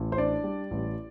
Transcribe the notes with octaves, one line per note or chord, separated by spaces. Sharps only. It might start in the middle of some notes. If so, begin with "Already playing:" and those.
Already playing: A1
C5
D4 D5
G3
A1